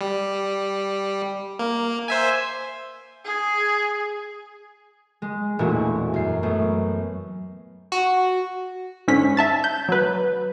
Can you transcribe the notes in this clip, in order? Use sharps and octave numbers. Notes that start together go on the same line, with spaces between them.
G3
A#3
C5 E5 G#5
G#4
G#3
E1 A#2 G#3 A3 E4 F#4
F#2 C7
F#2 A3 B3
F#4
G#2 D3 C#4 B6
E5 A5 A6
G6
F#3 B4